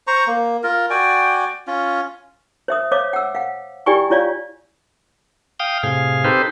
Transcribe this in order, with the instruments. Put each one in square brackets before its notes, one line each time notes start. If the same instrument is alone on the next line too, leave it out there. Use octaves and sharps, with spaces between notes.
[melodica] C5 A#5 C#6
A#3
F4 A#4
F#4 D5 G5 G#5
C#4 F4
[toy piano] C5 E5 D#6
C5 C#5 D#5 F5 D6
F#5 E6
F5 F#5
E4 G4 D5 G5 G#5 C#6
E4 F4 C#5 D5 F5
[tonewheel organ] F5 G5 D#6
A2 C3 G#4 F5
C4 D#4 G4 A4 B4 C5